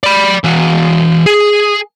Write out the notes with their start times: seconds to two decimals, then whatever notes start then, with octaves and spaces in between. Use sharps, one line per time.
0.03 D5 B5
0.44 E3 F#4
1.26 G#4